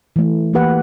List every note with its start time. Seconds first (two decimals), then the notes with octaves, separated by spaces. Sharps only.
0.16 E3 A3
0.53 E3 A#3 G4 B4 F#5